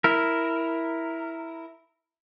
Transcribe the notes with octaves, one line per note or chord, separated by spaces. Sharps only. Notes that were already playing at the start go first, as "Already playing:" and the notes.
E4 A#4